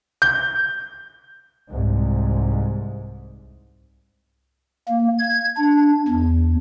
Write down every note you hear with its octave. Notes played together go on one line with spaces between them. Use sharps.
G6
C2 G#2
A#3
G#6
D4
E2